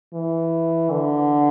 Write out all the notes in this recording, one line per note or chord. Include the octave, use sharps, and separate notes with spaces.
E3
D3